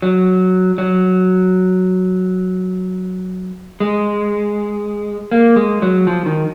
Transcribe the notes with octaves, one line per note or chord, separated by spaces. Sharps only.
F#3
F#3
G#3
A#3
G#3
F#3
F3
D#3